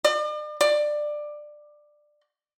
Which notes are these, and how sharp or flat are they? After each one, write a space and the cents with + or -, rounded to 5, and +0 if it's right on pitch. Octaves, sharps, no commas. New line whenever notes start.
D5 +45
D5 +15